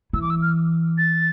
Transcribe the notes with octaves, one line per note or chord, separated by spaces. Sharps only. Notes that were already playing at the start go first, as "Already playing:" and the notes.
E3 E6
D6
E6
F6
A6